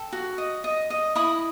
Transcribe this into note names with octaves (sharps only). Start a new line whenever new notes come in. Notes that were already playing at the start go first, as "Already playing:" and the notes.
Already playing: A4 G5
F#4
D#5
D#5
D#5
E4 B5 D#6